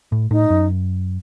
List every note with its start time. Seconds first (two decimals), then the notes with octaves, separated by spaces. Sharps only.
0.12 A2
0.31 A2 D#4
0.50 F#2